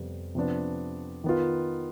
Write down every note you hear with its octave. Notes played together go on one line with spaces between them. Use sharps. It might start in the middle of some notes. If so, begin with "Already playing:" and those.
Already playing: F2 C3 G3 B3
C3 F3 B3 D4
D#3 B3 F4